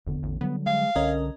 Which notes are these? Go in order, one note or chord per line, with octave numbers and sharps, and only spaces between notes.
F1 E2 D3 B3
A1
D3 F#3 G3 B3
G#3 F5
C2 D3 C#4 A#4 D#5